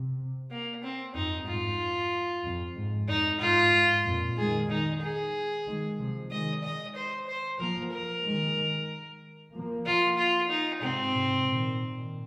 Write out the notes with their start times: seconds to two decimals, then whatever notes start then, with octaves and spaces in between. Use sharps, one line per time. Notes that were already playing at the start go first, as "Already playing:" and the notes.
Already playing: C3
0.51 A#3
0.83 C4
1.15 F2 D#4
1.47 G#2 F4
2.44 F2
2.77 G#2
3.08 F2 D#4
3.40 G#2 F4
3.73 G#2
4.05 F2 A#2
4.37 D#3 G#3 G#4
4.70 D#4
5.01 G#4
5.66 D#3 G#3
5.99 C3 F3
6.30 D#3 G#3 D#5
6.64 D#5
6.96 C5
7.28 C5
7.59 F3 A#3 A#4
7.92 A#4
8.24 D#3 G#3
9.53 F3 A#3
9.86 F4
10.17 F4
10.49 D#4
10.81 G#2 C3 C4
11.14 G#2 C3
11.46 A#2 D#3